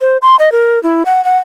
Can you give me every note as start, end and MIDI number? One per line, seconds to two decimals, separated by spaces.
0.01 0.17 72
0.22 0.36 84
0.39 0.52 75
0.52 0.81 70
0.83 1.03 64
1.06 1.24 78
1.25 1.37 78